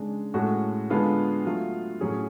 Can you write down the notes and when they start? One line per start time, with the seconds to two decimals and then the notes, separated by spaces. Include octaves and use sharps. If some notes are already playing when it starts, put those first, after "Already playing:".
Already playing: C#3 G#3 D4
0.34 A2 G#3 C#4 F#4 A4
0.90 D3 G#3 B3 F4 A4
1.46 F#3 A3 F4
2.01 A2 F#3 C#4 G#4